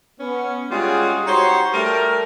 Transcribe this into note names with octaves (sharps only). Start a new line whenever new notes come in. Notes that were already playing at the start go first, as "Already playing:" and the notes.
B3 C#4
G3 G#3 C#4 F4 F#4 G#4
D#4 F#4 G4 C5 C#5
G3 A3 A4 A#4